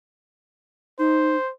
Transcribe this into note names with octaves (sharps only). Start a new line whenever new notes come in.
D#4 C5